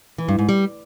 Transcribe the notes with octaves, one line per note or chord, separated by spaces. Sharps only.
E3
G2
G#2
G3